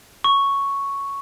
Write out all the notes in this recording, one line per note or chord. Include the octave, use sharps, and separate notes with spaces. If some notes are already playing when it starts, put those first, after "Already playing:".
C#6